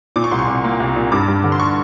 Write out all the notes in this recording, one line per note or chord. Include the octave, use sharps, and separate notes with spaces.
A#2 D6
C#6
C2 C6
C#6
C2
A#3
C2
A#2
G2 D6
G2
D3
C6
C#6